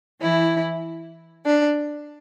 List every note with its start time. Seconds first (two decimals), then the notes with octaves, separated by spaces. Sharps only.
0.20 E3 E4
1.45 D4